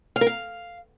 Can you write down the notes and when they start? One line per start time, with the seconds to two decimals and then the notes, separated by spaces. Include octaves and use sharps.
0.16 F5
0.21 A#4
0.27 F5